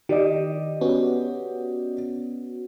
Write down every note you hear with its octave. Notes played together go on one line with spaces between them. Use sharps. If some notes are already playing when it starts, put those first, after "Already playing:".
D#3 G4 D5 D#5
B3 C#4 F#4